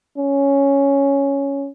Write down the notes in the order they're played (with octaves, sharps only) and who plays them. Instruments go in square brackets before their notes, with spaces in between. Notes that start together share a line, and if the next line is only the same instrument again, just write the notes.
[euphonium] C#4